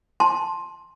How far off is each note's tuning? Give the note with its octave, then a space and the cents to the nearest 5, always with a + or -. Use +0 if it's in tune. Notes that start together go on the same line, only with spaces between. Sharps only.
A5 +0 C6 +10